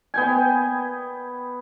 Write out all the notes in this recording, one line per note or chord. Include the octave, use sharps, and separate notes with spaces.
B3 G5 G#5